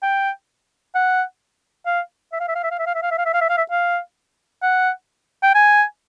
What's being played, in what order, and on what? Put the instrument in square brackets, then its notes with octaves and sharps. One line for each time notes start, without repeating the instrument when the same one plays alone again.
[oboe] G5
F#5
F5
E5
F5
E5
F5
E5
F5
E5
F5
E5
F5
E5
F5
E5
F5
E5
F5
E5
F5
F#5
G5
G#5